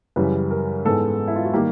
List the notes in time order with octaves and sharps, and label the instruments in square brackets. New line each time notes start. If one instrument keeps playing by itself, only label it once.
[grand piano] F#2 C#3 E3 G3 B4
A#4
G#2 E3 G#3 B3 A4
E4
F4
F#4
D#3 G3 A#3 G4